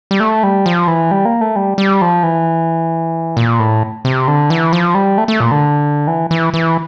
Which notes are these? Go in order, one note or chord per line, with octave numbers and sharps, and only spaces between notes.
G3
A3
G3
F3
E3
G3
A#3
A3
G3
G3
F3
E3
A#2
A2
C3
D3
E3
F3
G3
A3
A3
A#2
D3
E3
E3
E3